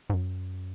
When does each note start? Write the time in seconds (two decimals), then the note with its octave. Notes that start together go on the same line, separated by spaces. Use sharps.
0.10 G#2
0.14 F#2